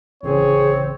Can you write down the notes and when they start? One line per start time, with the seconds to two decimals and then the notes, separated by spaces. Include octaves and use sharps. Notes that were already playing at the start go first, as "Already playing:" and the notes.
0.23 A1 C#3 C4 G#4 C#5